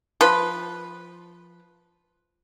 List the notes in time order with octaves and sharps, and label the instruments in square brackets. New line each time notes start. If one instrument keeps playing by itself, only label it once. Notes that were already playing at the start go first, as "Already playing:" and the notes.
[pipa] F3 B4